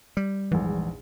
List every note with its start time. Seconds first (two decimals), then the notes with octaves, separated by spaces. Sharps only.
0.17 G3
0.52 A#1 E2 G#2 E3